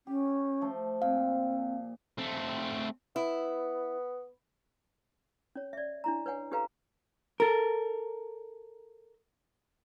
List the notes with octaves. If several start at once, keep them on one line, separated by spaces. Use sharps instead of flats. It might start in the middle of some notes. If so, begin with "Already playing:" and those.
C#4 G4
F3 A3
A#2 C4 F5
A3 C4
B3 E4
C#4 C#5
D5 E5
D4 E4 A#5
B4 C#5 F#5 G#5
C#4 G4 A4 B4 F5 A#5
A4 A#4